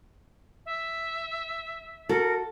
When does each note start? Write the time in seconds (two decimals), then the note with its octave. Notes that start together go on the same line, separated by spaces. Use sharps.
0.65 E5
2.09 F#4 A4 A#4